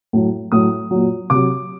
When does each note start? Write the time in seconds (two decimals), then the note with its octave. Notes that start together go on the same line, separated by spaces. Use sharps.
0.13 A2 F#3
0.52 A2 F#3 D#6
0.91 A#2 F#3
1.30 C3 F#3 D6